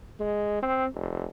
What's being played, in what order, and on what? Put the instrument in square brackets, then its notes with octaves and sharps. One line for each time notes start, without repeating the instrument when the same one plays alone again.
[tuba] G#3
C4
F1